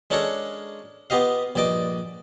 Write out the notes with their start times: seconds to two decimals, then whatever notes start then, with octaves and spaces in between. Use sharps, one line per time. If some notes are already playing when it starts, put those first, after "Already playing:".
0.10 G#3 C#4 D4 A4 A#4 C#5
1.10 B3 F4 G4 D#5 F5
1.55 A#1 G2 D5 D#5 D6